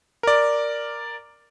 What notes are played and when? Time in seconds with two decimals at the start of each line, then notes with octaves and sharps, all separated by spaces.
0.23 A#4 D5